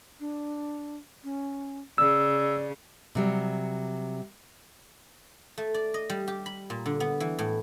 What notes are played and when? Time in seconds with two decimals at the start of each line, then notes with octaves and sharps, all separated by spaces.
0.20 D4
1.24 C#4
1.98 C#3 D5 E6
3.15 C3 F#3 G3
5.58 A3
5.74 D5
5.94 D#5
6.10 G3
6.28 G4
6.46 B5
6.70 A#2
6.86 D3
7.00 B3
7.20 E3
7.39 A2